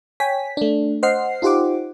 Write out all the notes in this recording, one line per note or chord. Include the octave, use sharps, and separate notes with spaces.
C#5 G5 G#5 B6
A3 D4
C5 D#5 F#5 F6 C7
D#4 F4 G4 C5 F#5 D6